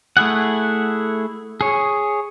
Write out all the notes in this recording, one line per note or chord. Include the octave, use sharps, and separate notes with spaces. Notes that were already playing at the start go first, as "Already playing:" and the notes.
A3 E4 G#4 F#5
G#4 C#5